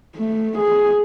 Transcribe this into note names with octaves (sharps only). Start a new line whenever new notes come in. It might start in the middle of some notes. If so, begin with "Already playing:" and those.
A3
G#4